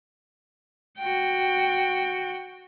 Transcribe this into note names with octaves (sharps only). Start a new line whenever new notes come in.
F#4 G5